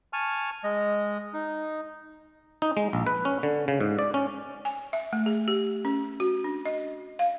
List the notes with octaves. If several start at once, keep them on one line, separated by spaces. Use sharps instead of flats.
G#5 A5 C#6 F6
G#3 D#5
D#4
D#4
G#3
A#1
B4
C#4
D3
C#3
G#2
D5
C#4
G#5
E5
A3
G#4
G4
C#4
F#4
D4
D#5
F5